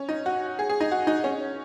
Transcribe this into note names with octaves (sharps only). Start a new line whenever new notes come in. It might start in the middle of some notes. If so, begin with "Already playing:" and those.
Already playing: C#4
D#4
F#4
G#4
G#4
D#4
F#4
D#4
C#4